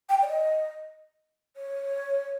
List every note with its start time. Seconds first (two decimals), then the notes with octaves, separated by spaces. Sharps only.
0.09 G5
0.22 D5
0.28 D#5
1.56 C#5